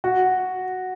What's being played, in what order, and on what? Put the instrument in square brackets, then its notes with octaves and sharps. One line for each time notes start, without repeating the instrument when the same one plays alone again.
[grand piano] F#4